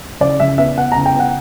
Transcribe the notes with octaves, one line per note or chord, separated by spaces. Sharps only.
C#3 D5
C#3 E5
B3 E5
B3 F#5
C#3 A#5
G5
B3 F#5